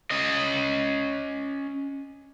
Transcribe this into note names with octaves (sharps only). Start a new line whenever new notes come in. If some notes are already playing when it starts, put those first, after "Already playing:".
C#4 D#5